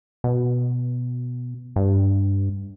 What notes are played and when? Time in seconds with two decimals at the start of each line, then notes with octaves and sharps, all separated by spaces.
0.24 B2
1.76 G2